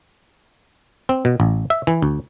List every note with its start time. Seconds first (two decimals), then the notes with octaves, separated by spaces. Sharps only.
1.09 C4
1.25 B2
1.40 A1
1.70 E5
1.87 E3
2.02 D2